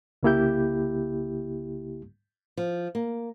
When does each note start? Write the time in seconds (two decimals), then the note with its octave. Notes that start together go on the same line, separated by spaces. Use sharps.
0.23 C2 C#3 A#3 E4 G4 G6
2.57 F3
2.95 A#3